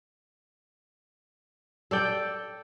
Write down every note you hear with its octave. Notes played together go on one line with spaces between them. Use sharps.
A4 D5 G5